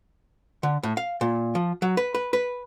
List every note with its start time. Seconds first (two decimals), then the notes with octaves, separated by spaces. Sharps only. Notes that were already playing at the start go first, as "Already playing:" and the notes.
0.63 D3
0.83 A2
0.97 F5
1.21 A#2
1.55 F3
1.82 F#3
1.97 B4
2.15 B4
2.33 B4